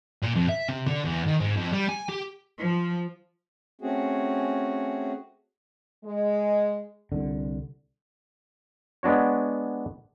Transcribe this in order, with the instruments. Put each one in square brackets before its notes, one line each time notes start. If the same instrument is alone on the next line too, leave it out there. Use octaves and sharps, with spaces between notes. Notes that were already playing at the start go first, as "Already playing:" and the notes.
[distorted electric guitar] A#2
F2
E5
C3
D3
E2
D#3
G#2
F2
G3
G#5
G4
[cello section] F3
[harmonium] A3 C4 C#4 F#4 G#4
[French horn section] G#3
[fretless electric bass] C2 D3
[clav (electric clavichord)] G#3 B3 D4 F#4 C#5